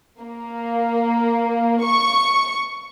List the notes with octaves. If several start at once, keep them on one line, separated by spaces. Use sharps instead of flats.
A#3
C#6